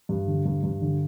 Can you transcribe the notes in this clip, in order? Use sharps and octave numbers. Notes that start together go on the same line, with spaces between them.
G2
D3
G2
G2
D3